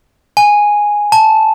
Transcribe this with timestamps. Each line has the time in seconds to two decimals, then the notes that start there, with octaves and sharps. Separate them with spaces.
0.37 G#5
1.12 A5